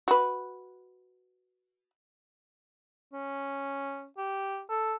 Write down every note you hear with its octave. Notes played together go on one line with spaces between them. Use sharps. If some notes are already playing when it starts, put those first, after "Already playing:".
F#4 B4
C#4
G4
A4